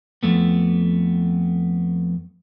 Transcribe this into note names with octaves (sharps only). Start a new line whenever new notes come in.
F2 A3 B3